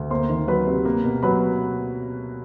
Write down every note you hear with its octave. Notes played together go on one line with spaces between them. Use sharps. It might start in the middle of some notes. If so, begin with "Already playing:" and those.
Already playing: D2
A#3 C5 C6
D#3
F#3 B4 B5
C3
A#3
B2
F#3 B4 B5